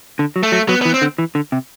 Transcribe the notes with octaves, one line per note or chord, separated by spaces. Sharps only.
D3
F#3
A3
F#3
F#3 B3
E3 B3
C4
D3
E3
D3
C3